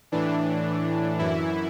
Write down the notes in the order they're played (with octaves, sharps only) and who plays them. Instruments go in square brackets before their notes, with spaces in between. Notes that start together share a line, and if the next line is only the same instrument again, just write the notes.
[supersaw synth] A2 E3 D4
F#2 E3 E4